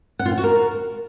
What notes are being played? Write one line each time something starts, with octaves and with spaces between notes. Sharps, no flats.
F#5
F4
F#5
F#4
A#4